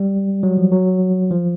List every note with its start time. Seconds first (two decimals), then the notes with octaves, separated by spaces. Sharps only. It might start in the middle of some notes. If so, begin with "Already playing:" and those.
Already playing: G3
0.43 F#3
0.57 F3
0.72 F#3
1.31 F3